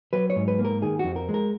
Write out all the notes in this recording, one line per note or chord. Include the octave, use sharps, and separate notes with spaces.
F#3 B4
C#5
G#2
B4
A#3
A#4
D#3 G#4
F#4
F2
A#4
G#3
A#4